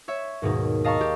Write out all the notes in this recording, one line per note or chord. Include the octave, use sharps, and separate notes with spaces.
C#5 E5
D#2 G#2 B2 D#4
D#5 F5 A5 A#5 C#6
G4